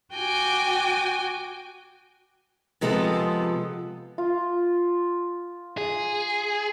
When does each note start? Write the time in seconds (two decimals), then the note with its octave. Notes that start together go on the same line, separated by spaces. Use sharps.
0.14 F#4 G5 G#5 D6
2.81 C3 F3 G#3 B3 A4
4.18 F4
5.78 G#4